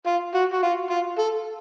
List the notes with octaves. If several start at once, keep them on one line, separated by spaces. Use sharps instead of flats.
F4
F#4
F#4
F4
F4
A4